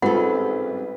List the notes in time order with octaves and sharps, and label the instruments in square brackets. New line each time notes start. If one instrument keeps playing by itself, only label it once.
[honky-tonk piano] A1 G#2 G3 [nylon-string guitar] C4 A4 [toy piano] F4 F#5 [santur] B4